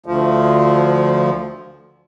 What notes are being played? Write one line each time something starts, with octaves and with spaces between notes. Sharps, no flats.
D2 F3